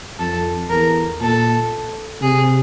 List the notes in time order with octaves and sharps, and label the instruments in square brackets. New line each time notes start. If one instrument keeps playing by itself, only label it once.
[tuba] F2 [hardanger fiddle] A4
[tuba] E2 [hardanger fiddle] A#4
[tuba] A#2 [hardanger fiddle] A4
[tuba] C3 [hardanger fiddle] G#4